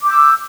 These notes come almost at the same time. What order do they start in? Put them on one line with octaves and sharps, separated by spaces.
D6 G6 E6